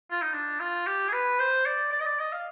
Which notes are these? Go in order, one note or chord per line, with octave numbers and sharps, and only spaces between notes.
F4
D#4
D4
F4
G4
G#4
B4
C5
D5
D5
D#5
D5
D#5
F5